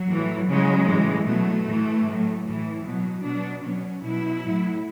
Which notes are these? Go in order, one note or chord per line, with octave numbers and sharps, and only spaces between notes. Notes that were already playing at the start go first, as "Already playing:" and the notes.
Already playing: F#3
A2 E3
C#3 F#3 G#3
A2 E3
B2 F#3 A3
A2 E3
A2 F#3
A2 E3
B2 F#3
B2 F#3 D4
B2 F#3 C#4
B2 F#3 E4
A2 F#3